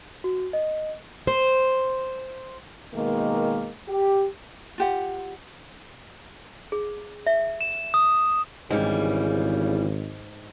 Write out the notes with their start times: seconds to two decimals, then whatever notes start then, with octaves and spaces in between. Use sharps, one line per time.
0.24 F#4
0.53 D#5
1.27 C5
2.95 B2 D#3 G#3 A#3
3.89 G4
4.78 F4 G4 F#5
6.72 G#4
7.27 E5
7.61 E7
7.94 D#6
8.70 G#1 G#2 C#3 E3 G3